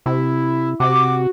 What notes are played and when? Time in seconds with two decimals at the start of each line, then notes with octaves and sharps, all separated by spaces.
0.06 C3 E4
0.80 C3 F#4 D6